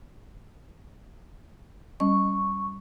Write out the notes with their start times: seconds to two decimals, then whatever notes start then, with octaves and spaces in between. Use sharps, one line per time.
2.00 G3 C#4 D#5 C#6